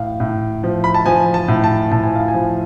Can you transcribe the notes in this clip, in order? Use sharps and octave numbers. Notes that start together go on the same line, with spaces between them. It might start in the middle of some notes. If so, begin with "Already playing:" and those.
Already playing: A2 F5
A2
F3
B5
A5
F3 G#5
A5
A2
A5
A2 A5
G#5
F5
G#5
F3